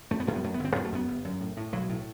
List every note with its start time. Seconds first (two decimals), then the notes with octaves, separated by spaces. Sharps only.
0.11 F#2 A3
0.20 B3
0.27 F#2 A3
0.35 B3
0.44 F#2 A3
0.54 B3
0.59 G1
0.65 C4
0.76 F#2 B3
0.85 A3
0.92 F#2 B3
1.08 G1
1.25 F#2
1.41 A2
1.57 A2
1.72 B1 F#3
1.89 A2